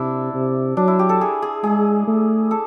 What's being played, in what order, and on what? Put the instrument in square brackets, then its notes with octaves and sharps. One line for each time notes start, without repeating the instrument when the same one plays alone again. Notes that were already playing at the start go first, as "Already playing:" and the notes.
Already playing: [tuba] C3 [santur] D4 E4
[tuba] C3
[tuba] F#3 [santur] D4
[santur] E4
G4
A4
G#4
G#4
[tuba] G#3 [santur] G#4
[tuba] A3
[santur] A4